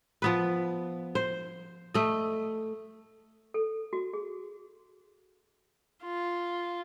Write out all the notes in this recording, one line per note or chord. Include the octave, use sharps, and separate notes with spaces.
F3 B3 B4
C5
A3 D#5
A4
F#4
G#4
F4